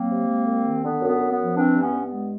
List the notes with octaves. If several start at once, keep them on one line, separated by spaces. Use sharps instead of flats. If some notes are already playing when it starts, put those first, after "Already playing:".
Already playing: F#3 A#3 C4
C3
G#3
C2
D#3
D3 B3
F#2
B3
F#2
B3
F3
E3 C4 D4
G2
B3 C#4
G2
B3
G#3